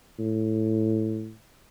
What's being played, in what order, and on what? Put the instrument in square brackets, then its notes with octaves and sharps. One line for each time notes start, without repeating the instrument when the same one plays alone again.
[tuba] A2